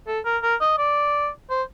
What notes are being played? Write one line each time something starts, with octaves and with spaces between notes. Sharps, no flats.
A4
A#4
A#4
D#5
D5
C5